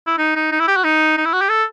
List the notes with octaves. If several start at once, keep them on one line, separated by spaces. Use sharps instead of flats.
E4
D#4
D#4
D#4
E4
G4
F#4
D#4
D#4
E4
F#4
G4
A4